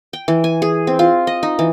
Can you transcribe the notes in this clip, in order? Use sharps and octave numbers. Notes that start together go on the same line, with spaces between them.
G5
E3
G#5
G#4
C4
F4
D#5
D#4
E3